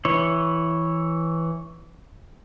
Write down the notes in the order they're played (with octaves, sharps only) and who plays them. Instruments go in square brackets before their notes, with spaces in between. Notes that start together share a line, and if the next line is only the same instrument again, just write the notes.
[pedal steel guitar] E3 E4 C#5